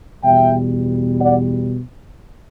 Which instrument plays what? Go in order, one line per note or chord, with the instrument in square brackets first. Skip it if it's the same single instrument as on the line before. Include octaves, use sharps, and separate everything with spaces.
[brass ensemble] E2 B2 G3 E5 G5
D5 F#5